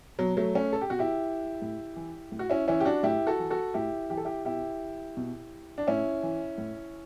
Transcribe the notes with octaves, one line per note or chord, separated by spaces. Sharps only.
B2 F#3
F#3 A3
A3 C#4
A4
G4
B2 F#4
E4 G4
A2
E3
A2
F#4
C#4 E4
E3 C#4 E4
G4
D4 F#4
A2 E4 G4
F#4 A4
E3
F#4 A4
A2 E4 G4
E3 G4
A4
E4 G4
B2 E4 G4
B2
D4
A2 C#4 E4
E3
A2